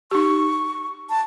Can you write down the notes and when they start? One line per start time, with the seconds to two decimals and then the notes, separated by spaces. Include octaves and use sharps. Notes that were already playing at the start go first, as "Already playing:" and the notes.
0.11 D#4 G4 C#6
1.10 A5